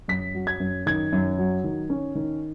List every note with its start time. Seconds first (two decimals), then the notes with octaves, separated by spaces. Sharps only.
0.08 F#2 B6
0.35 F#3
0.47 G#6
0.60 F#2
0.86 D#3 G#6
1.12 F#2
1.38 F#3
1.64 D#3
1.90 C#4
2.15 D#3